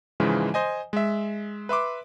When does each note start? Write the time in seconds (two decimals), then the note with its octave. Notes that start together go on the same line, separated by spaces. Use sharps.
0.20 G#2 C#3 E3 F3 G#3
0.54 C5 D#5 G#5
0.93 G#3 E5
1.69 B4 E5 C6 D6